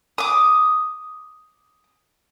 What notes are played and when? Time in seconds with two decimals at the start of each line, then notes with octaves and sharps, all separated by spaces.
0.18 D6 D#6